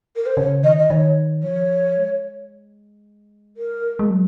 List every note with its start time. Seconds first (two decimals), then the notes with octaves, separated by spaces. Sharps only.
0.16 A#4
0.26 C5
0.36 C#3 C#5
0.63 D#3 D#5
0.79 D#5
0.90 D#3 C#5
1.43 F3 C#5
1.97 G#3
3.57 A#4
3.99 G#3
4.10 F#3